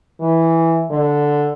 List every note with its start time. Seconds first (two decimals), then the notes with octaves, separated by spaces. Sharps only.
0.21 E3
0.90 D3